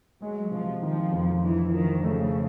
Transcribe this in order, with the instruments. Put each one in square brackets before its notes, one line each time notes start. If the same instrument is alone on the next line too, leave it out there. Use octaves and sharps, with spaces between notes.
[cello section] F#3 [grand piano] G#3
[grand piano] C3 [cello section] F3
[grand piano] D#3 [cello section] F3
[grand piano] F2
[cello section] E3 [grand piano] D4
[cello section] D#3 [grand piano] F3
[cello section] C#3 [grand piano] A3